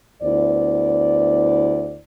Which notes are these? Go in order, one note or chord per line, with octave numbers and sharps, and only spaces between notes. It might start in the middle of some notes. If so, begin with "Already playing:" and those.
D2 B3 E4 C5 D5